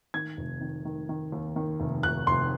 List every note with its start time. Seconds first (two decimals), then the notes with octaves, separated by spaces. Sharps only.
0.14 D#3 G#6
0.37 F1
0.61 D#3
0.85 D#3
1.09 D#3
1.32 D#2
1.56 D#3
1.80 F1
2.03 F1 F#6
2.27 F1 C6